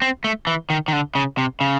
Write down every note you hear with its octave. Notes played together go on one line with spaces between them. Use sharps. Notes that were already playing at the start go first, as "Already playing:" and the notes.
C4
A3
E3
D#3
D#3
D3
C#3
C3
C#3